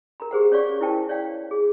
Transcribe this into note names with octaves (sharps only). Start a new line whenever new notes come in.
A#4 A#5 B5
G4 G#4 C5 F#5
C#4 C#5 D5 F5 C#6
E4 A#4 C5 G5 A5
C#5 D5 F5 G5
G#4